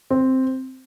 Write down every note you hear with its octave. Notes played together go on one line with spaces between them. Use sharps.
C4